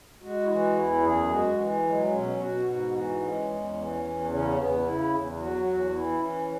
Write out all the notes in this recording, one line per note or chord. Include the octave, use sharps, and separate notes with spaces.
G#3 F#4
E4
E3 F#4
E2 E4
F#2 G#4
G#3 F#4
E3
F#3 G#3
B2 C#4
B2 F#4
G#2 F#4
E3 F#4
G#3 C#4
E2
E3
E2
C#3 C#4
E2 B3
C#3 E4
E2
F#3 F#4
E2 F#4
E3 E4
E3 C#4